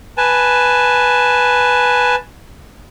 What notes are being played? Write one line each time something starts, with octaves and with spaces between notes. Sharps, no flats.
B4 G#5 A5